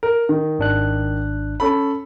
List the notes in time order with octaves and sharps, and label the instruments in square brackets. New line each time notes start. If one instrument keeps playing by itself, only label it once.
[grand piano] A#4
D#3
[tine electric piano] G#1 D4 F#6
[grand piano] C#4 A4 B5